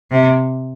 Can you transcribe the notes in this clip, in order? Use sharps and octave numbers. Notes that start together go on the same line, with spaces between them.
C3